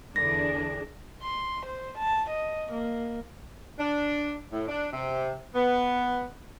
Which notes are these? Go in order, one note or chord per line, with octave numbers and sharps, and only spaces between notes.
E2 D3 D4 G#4 A#6
C6
C5
A5
D#5
A#3
D4
A2
D4
C3
B3